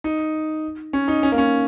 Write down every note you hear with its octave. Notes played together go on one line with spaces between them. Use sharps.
D#4
C#4
D#4
C#4
A#3
C#4